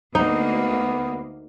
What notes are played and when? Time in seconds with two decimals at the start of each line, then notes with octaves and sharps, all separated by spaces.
0.15 D2 A#3 B3 D#4